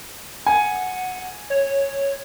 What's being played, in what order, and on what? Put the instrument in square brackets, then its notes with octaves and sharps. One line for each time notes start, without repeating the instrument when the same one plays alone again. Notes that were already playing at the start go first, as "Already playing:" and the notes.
[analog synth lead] F#5 [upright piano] G#5
[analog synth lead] C#5